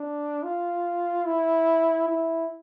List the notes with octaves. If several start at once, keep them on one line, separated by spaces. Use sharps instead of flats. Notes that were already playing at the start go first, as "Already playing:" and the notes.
Already playing: D4
F4
E4
E4